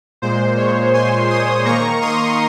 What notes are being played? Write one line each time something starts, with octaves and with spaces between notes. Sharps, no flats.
A#2 G#3 C5
C#5
G#5 C6
C6 D#6
D#3 A#3 A#5 C#6
C6 D#6